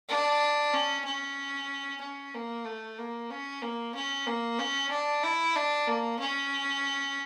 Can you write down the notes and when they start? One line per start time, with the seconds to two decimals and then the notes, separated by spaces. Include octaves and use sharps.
0.09 D4
0.74 C#4
1.05 C#4
2.01 C#4
2.34 A#3
2.65 A3
2.99 A#3
3.30 C#4
3.62 A#3
3.95 C#4
4.27 A#3
4.59 C#4
4.90 D4
5.23 E4
5.56 D4
5.87 A#3
6.19 C#4